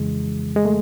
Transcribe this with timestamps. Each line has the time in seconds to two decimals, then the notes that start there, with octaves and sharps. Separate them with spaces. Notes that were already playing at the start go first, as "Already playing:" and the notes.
Already playing: F2 C#3 E3 G#3
0.56 G#3
0.65 A3